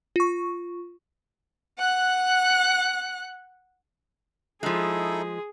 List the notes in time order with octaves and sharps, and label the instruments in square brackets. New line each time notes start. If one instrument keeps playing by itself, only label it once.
[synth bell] F4 C#6
[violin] F#5 F#6
[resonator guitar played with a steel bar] F3 G#3 [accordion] D#4 E4 A4 [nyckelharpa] G#4